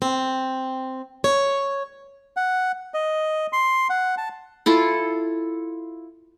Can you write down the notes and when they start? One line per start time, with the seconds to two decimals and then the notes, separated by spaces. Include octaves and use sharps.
0.02 C4
1.24 C#5
2.37 F#5
2.94 D#5
3.53 C6
3.90 F#5
4.18 A5
4.66 E4 F4 A4